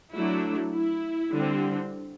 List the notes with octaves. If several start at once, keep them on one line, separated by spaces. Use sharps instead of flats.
F#3 A3 D4 E4
E4
D3 G3 C4